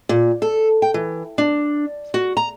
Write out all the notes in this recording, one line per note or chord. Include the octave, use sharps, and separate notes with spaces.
A#2
A4
G5
E3
D4
F#4
A#5